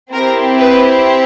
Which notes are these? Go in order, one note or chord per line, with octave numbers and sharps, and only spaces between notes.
C4 E4 G4 A#4
B4